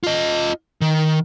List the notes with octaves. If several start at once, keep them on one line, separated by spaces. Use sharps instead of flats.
F4 D#5
D#3